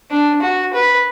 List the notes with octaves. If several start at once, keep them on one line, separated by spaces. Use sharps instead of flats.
D4
F#4
B4